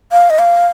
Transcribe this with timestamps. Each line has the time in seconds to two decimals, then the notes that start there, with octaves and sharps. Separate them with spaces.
0.12 F5
0.30 D#5
0.39 F5